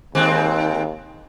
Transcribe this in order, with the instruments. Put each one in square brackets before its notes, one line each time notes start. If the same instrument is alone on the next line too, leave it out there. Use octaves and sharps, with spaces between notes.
[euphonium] D#2 [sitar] D#3 G#3 C4